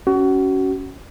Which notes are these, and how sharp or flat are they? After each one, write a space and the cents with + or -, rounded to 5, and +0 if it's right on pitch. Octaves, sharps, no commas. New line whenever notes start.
C#4 +10 F#4 +25